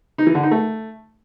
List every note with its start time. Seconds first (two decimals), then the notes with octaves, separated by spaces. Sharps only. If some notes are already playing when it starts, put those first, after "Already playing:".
0.18 D#4
0.27 E3
0.35 D3
0.43 D#4
0.51 A3